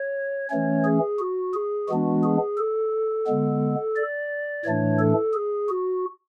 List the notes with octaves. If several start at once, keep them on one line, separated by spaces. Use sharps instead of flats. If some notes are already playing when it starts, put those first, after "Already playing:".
Already playing: C#5
E3 A3 C#4 C#5
G#4
F#4
G#4
E3 G#3 B3 D4 F#4
G#4
A4
D3 G#3 B3
D5
A2 E3 A3 D4 C#5
A4
G#4
F#4